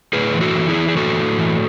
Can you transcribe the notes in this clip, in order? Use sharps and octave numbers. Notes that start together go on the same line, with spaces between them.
A2 G#4 B4
E3
F#4 A4
E3
E4 G#4
E3
G#4
A2 F#4 A4
A2
E3